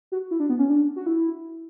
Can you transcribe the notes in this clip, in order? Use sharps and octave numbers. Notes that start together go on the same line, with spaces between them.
F#4
E4
D4
B3
C#4
D4
F#4
E4